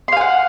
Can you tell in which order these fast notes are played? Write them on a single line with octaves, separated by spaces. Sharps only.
C6 F5 G#5 F#5